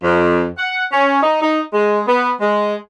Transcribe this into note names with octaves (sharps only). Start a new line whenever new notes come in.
F2
F#5
C#4
D#4
D#4
G#3
B3
G#3